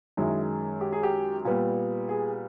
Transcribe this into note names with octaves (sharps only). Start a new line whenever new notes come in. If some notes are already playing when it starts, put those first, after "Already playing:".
F#2 D#3 G#3 E4
G4
G#4
G4
A#2 G3 B3
G#4